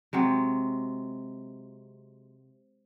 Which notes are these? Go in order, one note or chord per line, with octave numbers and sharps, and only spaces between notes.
C3 F#3 G#3